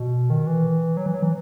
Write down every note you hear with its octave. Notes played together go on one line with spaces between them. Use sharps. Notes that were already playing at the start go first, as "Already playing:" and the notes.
Already playing: B2
D#3
E3
F#3
E3
F#3
E3